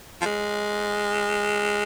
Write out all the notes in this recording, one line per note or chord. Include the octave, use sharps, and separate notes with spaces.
F3
G#3